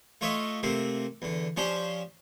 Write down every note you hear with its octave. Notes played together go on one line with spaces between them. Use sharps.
A3 F4 C#5 D#5 E5
C3 A3 A#3 C4
E2 D3
F3 C#4 D4 G4 C5